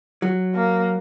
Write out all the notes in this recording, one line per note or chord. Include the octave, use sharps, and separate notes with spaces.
F#3
A#3